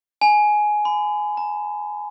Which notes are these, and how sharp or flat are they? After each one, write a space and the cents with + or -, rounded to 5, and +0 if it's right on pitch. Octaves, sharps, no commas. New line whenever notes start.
G#5 +15
B5 +40
A#5 -10